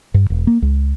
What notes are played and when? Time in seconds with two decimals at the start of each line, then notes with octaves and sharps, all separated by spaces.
0.14 G2
0.30 E1
0.47 A#3
0.62 C#2